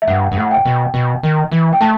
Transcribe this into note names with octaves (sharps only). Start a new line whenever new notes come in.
E5
G2 F#5
G2
A2 F#5
G5
B2
B2
D#3
E3
G5
A3 A5